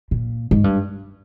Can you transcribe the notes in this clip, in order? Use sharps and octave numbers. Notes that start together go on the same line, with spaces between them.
A#2
G#2
G2